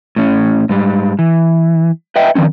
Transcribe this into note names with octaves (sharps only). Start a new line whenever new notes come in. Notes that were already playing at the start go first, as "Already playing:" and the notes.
A2 C#4
G#2 G3
E3
B4 D#5 E5 G5
D#3 F3 C4 C#4